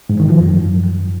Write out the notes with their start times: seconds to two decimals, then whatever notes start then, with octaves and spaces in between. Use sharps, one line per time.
0.10 G#2
0.20 D#3
0.30 F3
0.40 F#2